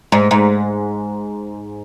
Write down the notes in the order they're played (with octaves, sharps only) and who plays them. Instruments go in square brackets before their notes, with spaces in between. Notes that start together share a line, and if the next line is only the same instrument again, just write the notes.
[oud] G#2
G#2